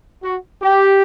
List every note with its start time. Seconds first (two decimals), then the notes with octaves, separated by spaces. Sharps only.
0.23 F#4
0.62 G4